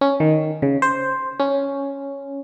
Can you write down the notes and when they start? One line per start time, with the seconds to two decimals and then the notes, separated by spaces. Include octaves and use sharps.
0.01 C#4
0.20 D#3
0.62 C#3
0.82 C5
1.40 C#4